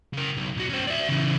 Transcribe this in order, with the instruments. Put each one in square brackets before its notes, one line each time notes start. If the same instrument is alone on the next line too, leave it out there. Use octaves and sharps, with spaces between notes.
[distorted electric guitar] C#3 A#4
B1
B1 F#4
C#4 C5
D5 E5
C#3 E3